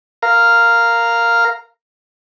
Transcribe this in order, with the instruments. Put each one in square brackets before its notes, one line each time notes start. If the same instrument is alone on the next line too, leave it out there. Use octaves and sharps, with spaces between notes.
[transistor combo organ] A#4 F5 A#5